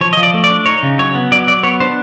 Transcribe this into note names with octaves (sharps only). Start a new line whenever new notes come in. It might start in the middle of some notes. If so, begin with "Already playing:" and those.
F3 C#5
F3 D#5
D5
A3
D5
D4
D#4 C#5
C#3
F#3 C#5
B3
F#3 D5
F#3 D5
B3 C#5
D4 C5